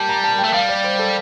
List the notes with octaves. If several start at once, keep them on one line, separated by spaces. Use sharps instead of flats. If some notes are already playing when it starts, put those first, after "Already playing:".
Already playing: G3 A5
A#5
A5
G5
A3
G3 F5
D5
C5
A4